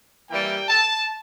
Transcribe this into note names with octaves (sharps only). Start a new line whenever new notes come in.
E3 G3 A#3 E4 G5
A5